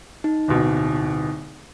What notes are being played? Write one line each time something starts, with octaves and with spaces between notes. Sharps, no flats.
D#4
D1 B2